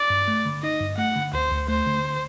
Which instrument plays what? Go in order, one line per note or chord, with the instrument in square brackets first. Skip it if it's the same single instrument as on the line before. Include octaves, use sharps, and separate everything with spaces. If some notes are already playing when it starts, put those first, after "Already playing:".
Already playing: [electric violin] D5
[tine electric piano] G2
A3
D3
[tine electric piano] D#4 [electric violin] D#5
[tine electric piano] G2
[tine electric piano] A3 [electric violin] F#5
[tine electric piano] D3
[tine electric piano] D2 [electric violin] C5
[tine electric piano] D2
[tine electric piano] A3 [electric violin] C5
[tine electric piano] D3